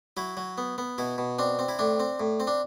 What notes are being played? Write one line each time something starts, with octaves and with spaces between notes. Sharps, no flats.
F#3 E4
F#3
B3
B3
B2 E4
B2
C4 D4
C4
E4
A2 D4
C4
A2
C4
D4